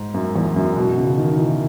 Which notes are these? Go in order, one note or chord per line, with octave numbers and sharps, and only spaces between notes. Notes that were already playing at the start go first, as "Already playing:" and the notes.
Already playing: G#2
F#2
E2
F#2
B2
C#3
D#3
E3